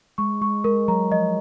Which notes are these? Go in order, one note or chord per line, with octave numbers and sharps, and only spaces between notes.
G#3 C#6
G#3 C#6
G#3 A#4
F#3 A#5
F3 D#5